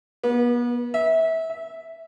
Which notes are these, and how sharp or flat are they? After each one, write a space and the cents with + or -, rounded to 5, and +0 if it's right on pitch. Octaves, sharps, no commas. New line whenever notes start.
B3 -35
E5 -25
E5 -5